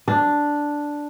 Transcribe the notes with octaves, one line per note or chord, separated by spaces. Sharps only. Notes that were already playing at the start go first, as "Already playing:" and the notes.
D4